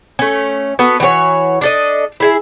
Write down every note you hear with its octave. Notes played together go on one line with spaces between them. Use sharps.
A3 C#4
B3 F#4 A4
E3 F#4 G4 C#5
D4 A4 D#5
E4 G#4 E5